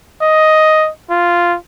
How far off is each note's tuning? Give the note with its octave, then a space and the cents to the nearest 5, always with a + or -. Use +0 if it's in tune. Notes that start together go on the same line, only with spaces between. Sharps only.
D#5 +5
F4 -5